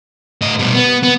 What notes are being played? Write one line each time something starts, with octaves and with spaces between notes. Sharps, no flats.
A2 D#5
B2 G3
B3
B3